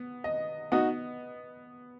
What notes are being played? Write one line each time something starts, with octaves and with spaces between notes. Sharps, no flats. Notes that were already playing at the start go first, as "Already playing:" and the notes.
Already playing: B3
D#5
B3 D#4 F#4